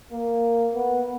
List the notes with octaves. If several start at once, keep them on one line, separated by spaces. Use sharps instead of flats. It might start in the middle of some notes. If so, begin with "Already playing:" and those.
A#3
B3